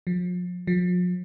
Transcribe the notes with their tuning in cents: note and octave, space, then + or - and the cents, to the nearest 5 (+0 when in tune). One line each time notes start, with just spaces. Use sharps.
F3 +35
F3 +40